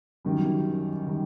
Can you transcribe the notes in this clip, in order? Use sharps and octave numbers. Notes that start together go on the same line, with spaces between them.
F#2 D#3 G3
D#3 G3